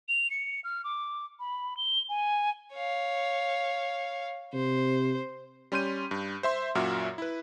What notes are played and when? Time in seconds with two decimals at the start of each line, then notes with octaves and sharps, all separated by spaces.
0.08 F7
0.30 C#7
0.64 F6
0.84 D6
1.40 B5
1.77 G7
2.09 G#5
2.74 C#5 F5
4.53 C3 C5
5.72 G3 C#4 C6 G6 D#7
6.11 G2
6.43 C5 E5 C6
6.75 F#2 A#2 F#4 E5 F6
7.18 E4 B4